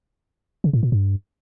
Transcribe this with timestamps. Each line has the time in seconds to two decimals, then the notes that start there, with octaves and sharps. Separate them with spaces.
0.64 C#3
0.73 A2
0.83 A#2
0.92 G2